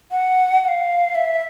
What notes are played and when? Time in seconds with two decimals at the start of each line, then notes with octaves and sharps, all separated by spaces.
0.11 F#5
0.63 F#5
0.68 F5
1.15 E5